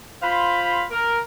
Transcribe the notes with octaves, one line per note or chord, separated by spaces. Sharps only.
F4 C5 F5 B5
A#4